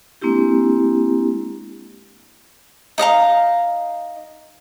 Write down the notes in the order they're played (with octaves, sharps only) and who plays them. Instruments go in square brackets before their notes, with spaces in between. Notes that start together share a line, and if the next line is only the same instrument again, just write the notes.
[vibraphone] G#3 A#3 C4 D4 E4 G4
[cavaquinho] D#4 D#5 F5 A#5